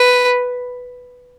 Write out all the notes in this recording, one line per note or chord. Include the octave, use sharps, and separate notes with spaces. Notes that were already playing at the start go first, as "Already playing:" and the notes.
Already playing: B4